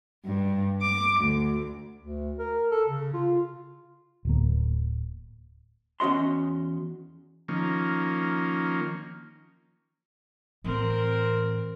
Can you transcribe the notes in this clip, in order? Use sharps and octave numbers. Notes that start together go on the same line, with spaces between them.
G2
D6
D2
D2
A#4
A4
C#3
F4
D1 A#3
E2 C#4 F#4 D#5 C6
D#3 F3 A#3 C#4
A2 E3 C4 A#4